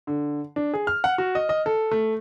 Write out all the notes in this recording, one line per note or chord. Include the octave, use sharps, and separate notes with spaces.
D3
D4
G#4
F6
F#5
F#4
D#5
D#5
A4
A3